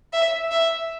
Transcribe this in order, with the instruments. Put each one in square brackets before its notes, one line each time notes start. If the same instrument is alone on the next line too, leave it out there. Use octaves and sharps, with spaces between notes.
[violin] E5
E5